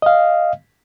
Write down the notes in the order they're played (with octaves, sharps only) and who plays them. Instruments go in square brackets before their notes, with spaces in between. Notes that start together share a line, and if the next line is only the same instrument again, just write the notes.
[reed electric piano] D#5 F5